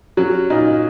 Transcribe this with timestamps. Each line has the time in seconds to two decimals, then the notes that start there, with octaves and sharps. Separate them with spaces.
0.17 F#3 C#4
0.50 A#2 D#4